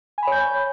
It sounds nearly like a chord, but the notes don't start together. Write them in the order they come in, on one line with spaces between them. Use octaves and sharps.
G#5 B5 C#5 G6